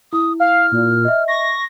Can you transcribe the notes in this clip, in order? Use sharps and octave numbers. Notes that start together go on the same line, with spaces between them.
E4 D#6
F5 F6
A#2
D#5 E5
C#6 A#6